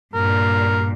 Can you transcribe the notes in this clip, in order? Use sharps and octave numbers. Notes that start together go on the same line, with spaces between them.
G2 A#2 A#4